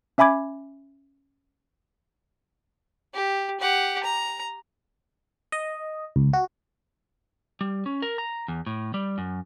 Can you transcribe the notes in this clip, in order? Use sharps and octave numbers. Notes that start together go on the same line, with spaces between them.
C#4 E5 G#5 B5 D6 G#6
G4
G4 F#5
A#5
D#5
C#2
F#4
G3
C#4
A#4
A#5
E2
A2
G3
F#2